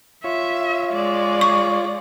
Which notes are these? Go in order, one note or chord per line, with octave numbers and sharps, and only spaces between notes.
F4 C#5 E5
G#3 D5
C#6